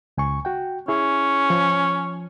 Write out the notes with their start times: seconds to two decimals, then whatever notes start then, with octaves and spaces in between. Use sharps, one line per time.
0.18 C#2 G#5 C#6
0.45 F#4 G5
0.88 C#4 E4 G#4
1.50 F3